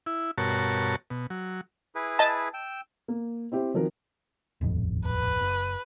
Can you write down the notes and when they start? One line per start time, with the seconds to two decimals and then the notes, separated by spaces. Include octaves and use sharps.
0.06 E4
0.38 G2 B2 F#4 A#4 C#5 A5
1.10 B2
1.30 F#3
1.95 E4 G#4 B4
2.19 D#5 A5
2.54 G5 E6
3.08 A#3
3.52 C4 E4 G4 C5
3.74 D#3 F3 C4 F#4 A#4
4.61 D#1 A1 F2
5.06 B4
5.41 F#1